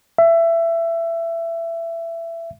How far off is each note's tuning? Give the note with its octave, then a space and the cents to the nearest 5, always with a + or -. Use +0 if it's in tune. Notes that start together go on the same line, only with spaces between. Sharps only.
E5 +20